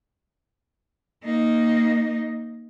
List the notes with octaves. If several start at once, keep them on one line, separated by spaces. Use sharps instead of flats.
A#3 D#4